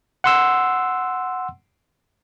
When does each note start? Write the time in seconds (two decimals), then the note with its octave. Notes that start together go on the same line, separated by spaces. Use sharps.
0.24 F#5 C6 E6